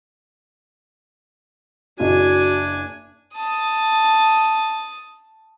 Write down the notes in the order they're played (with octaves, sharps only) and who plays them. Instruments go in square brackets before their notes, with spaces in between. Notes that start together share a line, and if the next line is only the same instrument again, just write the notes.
[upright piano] F#1 D5 [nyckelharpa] D4 G#5 [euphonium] F#4
[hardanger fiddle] A5 D#6